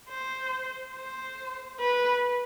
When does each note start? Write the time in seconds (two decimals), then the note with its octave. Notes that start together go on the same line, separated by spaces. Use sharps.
0.10 C5
0.95 C5
1.80 B4